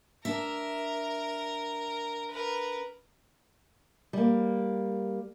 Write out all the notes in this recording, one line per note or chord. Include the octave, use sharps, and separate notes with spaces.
D4 A#4 E5
A#4 B4
G3 A#3